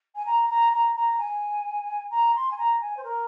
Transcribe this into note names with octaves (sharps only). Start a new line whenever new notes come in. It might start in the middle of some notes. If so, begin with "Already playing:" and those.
G#5
A#5
A#5
A#5
A#5
G#5
A#5
C6
G#5
A#5
G#5
C5
A#4